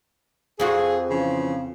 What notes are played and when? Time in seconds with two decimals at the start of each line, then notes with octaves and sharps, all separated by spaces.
0.60 F2 F4 F#4 G#4
1.09 C#3 E3 F3